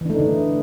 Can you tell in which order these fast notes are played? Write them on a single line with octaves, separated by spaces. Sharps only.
E3 D4 A3 D#4 D3